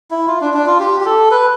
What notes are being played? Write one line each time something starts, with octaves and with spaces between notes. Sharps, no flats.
E4
F4
D4
D4
F4
G4
G4
A4
B4